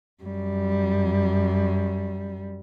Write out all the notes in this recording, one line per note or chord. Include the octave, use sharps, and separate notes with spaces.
F#2 G3